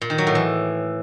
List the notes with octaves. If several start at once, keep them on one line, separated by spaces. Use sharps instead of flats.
A#2
D#3
F#3
A2
E3